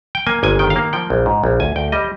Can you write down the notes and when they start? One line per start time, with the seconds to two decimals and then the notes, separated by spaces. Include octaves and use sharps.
0.15 G5
0.27 A#3 G#5
0.43 G1 G#5
0.59 D#3 G5
0.70 F5
0.76 A#3
0.93 F3 G5
1.10 A#1
1.26 G#2
1.44 A#1
1.60 D2 G#5
1.76 D2 G5
1.92 G3 D#5